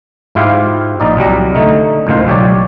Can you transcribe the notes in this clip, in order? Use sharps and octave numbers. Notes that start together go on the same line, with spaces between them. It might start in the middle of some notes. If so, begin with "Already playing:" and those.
G#2 E4 F4 G4 F5
A#1 D#4 D5
C2 F#3 G3 A#5
D3 A3 D#4
C#2 A2 D#3 F4 C5
B1 G4 C#5 D5